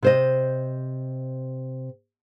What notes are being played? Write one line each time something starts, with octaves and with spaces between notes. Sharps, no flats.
C3 C5 D#5